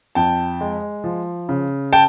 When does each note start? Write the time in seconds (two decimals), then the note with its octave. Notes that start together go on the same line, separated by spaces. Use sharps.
0.15 F2 G5 A5
0.61 G#3
1.04 F3
1.49 C#3
1.93 G5 A5